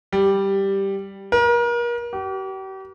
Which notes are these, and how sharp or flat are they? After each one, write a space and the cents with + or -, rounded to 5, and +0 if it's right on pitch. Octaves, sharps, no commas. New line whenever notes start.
G3 +0
A#4 +35
G4 -40